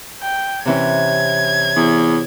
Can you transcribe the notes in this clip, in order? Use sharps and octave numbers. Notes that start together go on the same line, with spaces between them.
G5
C3 E3 C#4 G#6
E2